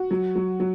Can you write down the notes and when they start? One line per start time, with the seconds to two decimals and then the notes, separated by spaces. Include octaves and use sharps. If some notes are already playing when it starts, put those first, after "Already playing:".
Already playing: F#4
0.11 F#3
0.36 F#3
0.60 F#3